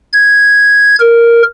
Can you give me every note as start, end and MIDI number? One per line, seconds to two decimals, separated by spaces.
0.12 0.95 92
1.00 1.42 70